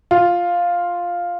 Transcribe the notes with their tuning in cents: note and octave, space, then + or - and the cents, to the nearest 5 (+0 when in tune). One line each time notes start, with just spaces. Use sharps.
F4 +0